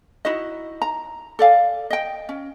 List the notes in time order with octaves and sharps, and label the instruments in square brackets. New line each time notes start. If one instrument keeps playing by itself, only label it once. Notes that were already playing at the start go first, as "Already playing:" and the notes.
[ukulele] D#4 E4 F#4 D#5
A#5
A4 D5 F5 G#5
D#5 G5
C#4